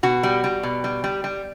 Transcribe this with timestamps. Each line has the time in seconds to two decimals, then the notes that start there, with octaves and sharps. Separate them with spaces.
0.03 B2 F#4
0.23 G3
0.44 G3
0.63 B2
0.84 G3
1.04 G3
1.24 G3